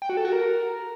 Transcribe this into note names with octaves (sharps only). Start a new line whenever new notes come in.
G5
F#4
A4
F#4
A#4